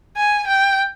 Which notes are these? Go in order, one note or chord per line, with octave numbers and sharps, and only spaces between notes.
G#5
G5